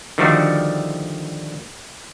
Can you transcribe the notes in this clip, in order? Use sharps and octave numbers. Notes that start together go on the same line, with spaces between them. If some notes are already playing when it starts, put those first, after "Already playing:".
D3 D#3 F3 G3 A3 F#4